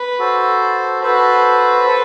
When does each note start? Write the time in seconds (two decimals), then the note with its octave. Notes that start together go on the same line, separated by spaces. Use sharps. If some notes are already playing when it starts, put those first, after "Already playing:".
Already playing: B4
0.18 F#4 A4 C5
1.03 F#4 A4 B4 C5
1.87 A4 C5